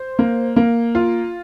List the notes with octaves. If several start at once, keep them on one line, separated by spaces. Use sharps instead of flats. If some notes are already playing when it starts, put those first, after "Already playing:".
Already playing: C5
A#3
A#3
F4